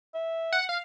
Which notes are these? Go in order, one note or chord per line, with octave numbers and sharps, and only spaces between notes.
E5
F#5
F5